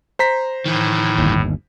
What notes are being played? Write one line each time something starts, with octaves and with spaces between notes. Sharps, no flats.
C5 A#5 B6
A2 D#3 E3
G1 D#2